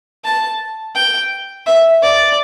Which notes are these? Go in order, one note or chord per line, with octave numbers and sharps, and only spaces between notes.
A5
G5
E5
D5